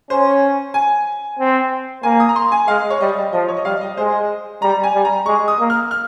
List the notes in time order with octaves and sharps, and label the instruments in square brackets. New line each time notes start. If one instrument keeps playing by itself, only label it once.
[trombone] C#4 [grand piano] C5
[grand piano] G#5
[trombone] C4
[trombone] A#3 [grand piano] G#5
[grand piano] D#6
A#5
C6
G#5
[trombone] G#3 [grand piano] F5
[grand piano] C#5
[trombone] G3 [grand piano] D#5
[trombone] F3 [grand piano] D#5
[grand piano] C#5
D#5
[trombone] G3 [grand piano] F5
[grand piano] D#5
[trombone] G#3 [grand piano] C5
[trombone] G3 [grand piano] A#5
[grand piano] G#5
[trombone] G3
[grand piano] A#5
[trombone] G#3 [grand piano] C#6
[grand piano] D#6
[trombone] A#3
[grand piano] F6
F6